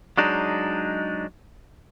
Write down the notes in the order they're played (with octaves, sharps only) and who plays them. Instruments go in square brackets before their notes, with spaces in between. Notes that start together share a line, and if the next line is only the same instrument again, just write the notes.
[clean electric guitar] F#3 G#3 D4 D#4